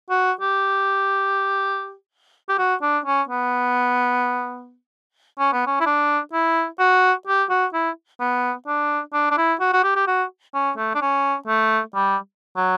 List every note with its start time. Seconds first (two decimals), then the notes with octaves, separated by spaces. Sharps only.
0.10 F#4
0.41 G4
2.49 G4
2.58 F#4
2.82 D4
3.06 C#4
3.29 B3
5.39 C#4
5.52 B3
5.66 C#4
5.80 E4
5.86 D4
6.33 E4
6.79 F#4
7.27 G4
7.50 F#4
7.74 E4
8.20 B3
8.67 D4
9.13 D4
9.31 D4
9.38 E4
9.60 F#4
9.73 F#4
9.84 G4
9.96 G4
10.07 F#4
10.54 C#4
10.78 A3
10.95 D4
11.02 C#4
11.47 A3
11.95 G3
12.56 F#3